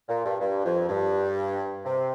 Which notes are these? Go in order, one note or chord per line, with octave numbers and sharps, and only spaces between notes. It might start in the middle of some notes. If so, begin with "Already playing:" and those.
A#2
G2
G2
F2
G2
C3